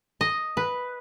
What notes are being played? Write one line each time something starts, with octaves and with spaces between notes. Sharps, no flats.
D#5
B4